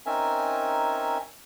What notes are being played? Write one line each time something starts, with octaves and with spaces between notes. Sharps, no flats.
C4 C#4 D#4 A#4 E5 G#5